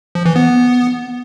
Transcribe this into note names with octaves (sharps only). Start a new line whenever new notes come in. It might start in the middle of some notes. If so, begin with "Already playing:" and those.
F3
E3
B3